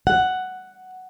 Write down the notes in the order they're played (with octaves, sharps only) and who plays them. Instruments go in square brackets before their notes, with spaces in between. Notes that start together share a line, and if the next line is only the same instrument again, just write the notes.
[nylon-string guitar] F#5